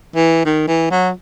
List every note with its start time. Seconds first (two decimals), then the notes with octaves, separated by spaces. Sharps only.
0.15 E3
0.45 D#3
0.68 E3
0.90 F#3